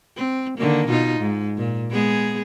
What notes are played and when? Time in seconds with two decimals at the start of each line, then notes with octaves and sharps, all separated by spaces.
0.16 C4
0.58 D3 D#3 A#3
0.89 B2 D#4 F4
1.20 G#2
1.58 A#2
1.91 G#3 B3 G#4